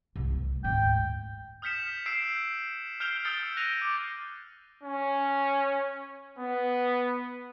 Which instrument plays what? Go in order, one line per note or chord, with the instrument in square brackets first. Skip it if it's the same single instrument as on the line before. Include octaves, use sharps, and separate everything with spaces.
[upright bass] C2
D2
[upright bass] D2 G#2 [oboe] G5
[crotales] D#6 F6 G6 B6 C#7 E7
E6 G6 C7 D7 E7
F6 G6 C7 D7 F7 G7
D#6 E6 G6 A6 C#7 G7
F#6 A#6 D7 D#7 F7 G7
D6
[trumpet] C#4
B3